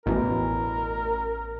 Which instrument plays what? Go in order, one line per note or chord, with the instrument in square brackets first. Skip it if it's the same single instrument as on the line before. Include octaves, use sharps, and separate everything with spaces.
[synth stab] A1 [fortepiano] E2 B2 E3 [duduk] A#4